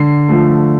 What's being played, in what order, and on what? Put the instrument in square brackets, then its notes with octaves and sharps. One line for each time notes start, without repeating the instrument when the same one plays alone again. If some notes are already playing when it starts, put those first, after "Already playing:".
Already playing: [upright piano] D3 C7
F3 A3